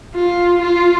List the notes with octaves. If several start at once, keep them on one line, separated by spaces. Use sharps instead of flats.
F4
F4